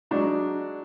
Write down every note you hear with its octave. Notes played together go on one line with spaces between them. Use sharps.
F#3 G#3 D4 D#4 F#4